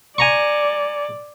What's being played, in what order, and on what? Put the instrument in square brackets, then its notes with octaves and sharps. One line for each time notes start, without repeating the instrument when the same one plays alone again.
[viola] D5 [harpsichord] G#5 A#5 C#6